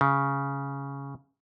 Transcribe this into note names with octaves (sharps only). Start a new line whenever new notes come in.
C#3